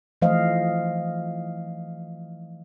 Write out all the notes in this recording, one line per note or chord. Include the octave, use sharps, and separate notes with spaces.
E3 F3 A3 C5 D#5 F5